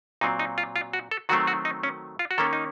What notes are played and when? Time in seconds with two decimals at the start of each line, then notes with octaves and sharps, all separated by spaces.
0.21 A#2 F#3 C4 D#4
0.39 D#4
0.58 F4
0.76 F4
0.93 F#4
1.11 A4
1.29 D#3 F#3 A3 C4 F#4
1.47 F#4
1.65 D#4
1.83 C#4
2.19 F4
2.31 F#4
2.38 D#3 A#3 C#4 A4
2.53 D#4